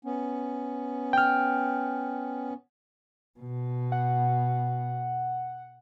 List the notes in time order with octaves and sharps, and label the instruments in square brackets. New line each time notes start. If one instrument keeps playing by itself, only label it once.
[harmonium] B3 C#4
[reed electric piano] G5 F6
[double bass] B2
[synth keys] F#5